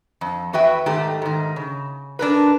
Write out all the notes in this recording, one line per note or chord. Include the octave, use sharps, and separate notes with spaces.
F2
E2 F#4 B4 E5 G5
G#2 D#3 A3 G4
G#2 D#3
C#3
D4 A#4 B4